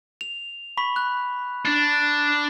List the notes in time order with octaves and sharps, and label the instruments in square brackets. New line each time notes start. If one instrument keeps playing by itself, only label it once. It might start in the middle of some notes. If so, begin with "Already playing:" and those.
[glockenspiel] F7
B5 C#6 B6
F#6
[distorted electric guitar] D4